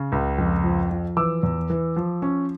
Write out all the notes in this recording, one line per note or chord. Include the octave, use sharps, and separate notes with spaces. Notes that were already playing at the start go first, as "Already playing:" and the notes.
Already playing: C#3
C#2
F2
F3
F3
E3 D6 E6
E2
E3
F3
C#4